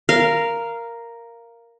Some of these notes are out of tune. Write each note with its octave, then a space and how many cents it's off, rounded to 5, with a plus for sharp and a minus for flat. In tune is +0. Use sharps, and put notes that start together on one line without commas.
A#4 +0 F5 -15